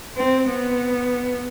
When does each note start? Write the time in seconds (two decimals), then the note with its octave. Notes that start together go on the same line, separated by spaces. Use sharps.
0.17 C4
0.49 B3